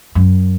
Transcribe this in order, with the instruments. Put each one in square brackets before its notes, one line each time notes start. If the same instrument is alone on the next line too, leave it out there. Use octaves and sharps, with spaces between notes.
[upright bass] F#2